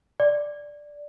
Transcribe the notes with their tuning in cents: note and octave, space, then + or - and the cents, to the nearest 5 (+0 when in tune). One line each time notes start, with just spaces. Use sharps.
D5 +0